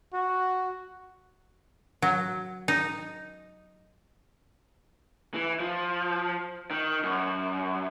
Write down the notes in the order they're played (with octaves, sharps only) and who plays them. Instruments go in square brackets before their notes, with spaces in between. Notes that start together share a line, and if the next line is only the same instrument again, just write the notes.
[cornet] F#4
[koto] F#3
D#4
[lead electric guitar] E3
F3
D#3
F#2